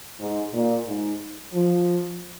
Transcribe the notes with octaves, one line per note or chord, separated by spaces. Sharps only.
G#2
A#2
G#2
F3